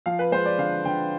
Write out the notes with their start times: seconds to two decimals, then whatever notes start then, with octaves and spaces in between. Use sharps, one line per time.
0.06 F3 F5
0.19 B4
0.32 G#3 C5
0.45 D5
0.58 D3 F5
0.85 D3 G5